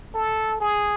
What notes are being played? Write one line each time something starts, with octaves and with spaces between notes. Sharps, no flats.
A4
G#4